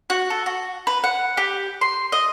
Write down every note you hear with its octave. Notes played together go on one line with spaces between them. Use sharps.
F#4
A4
F#4
B4
F#5
G4
C6
D#5